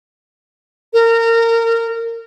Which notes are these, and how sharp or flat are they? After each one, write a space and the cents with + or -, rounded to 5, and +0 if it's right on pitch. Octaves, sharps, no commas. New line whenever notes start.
A#4 -25